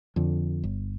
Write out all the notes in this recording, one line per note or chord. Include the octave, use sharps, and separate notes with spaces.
F2 D3
G1